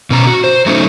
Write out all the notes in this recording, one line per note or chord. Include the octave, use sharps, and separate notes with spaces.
B2 C#4 A#5
F#4
C5
F#3 A3 C#4 D#4